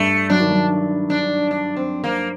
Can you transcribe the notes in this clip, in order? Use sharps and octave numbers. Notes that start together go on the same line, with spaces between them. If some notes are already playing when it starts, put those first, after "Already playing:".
Already playing: G2 A3
F#3 D4
D#3
F#3
D4
D4
C4
A#3